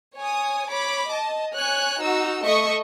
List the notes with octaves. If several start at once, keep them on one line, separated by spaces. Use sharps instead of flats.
C#5 G#5 D#6
C#5 B5 D6
D#5 A5
C#5 G#5 F#6
D#4 F#4 E6
A3 D#5 E5 C#6 D#6